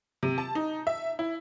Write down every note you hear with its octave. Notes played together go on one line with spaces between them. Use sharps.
C3
A5
D#4
E5
E4